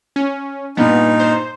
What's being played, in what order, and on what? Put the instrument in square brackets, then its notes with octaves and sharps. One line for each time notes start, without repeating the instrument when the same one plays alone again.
[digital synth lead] C#4
[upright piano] G2 A#2 [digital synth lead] B3 [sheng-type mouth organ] D#4
[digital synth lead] C5